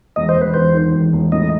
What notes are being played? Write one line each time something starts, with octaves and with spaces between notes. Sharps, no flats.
E1 D#5
C5
E1
B4
E2 C5
D#3
E1
E1
A2 D#5